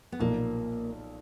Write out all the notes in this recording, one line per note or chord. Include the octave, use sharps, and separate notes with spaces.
B3
B1 A#2 F3 A#3